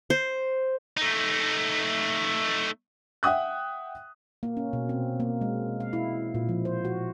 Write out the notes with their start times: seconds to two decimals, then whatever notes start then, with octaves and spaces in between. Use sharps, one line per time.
0.10 C5
0.97 A3 D#4
3.23 E5 F#5 G5 D#6 F#6
4.43 A#3
4.57 C#4
4.73 B2
4.89 C4
5.20 A#3
5.41 G#3
5.80 F5
5.93 E4
6.34 A#2
6.49 F3
6.65 C5
6.85 F#4